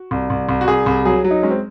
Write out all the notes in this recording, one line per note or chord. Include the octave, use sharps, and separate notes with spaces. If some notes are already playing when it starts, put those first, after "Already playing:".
Already playing: F#4
C2
C2
C2
F#4
C2 G#4
C2
F#3 G#4
F#3
D#4
G#3 C#4
C4